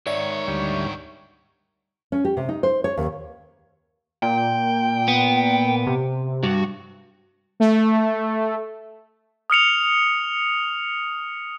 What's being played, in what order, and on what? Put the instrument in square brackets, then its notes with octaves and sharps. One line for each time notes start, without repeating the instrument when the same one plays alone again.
[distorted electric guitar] G#2 D#3 [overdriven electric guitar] C#5 [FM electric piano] D5 E5
[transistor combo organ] D2 G3
[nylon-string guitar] C#4
G4
C3
D#4
C5
C#5
D#2
[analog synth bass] A#2 [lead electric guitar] G5
[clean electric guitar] B3
[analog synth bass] C3
[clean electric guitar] G2 [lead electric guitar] F#4
[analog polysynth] A3
[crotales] D#6 F6 C#7 F7